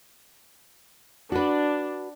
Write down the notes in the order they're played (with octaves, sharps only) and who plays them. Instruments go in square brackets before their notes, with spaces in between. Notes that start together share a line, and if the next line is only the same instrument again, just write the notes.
[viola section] D4 [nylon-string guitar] F#4 B4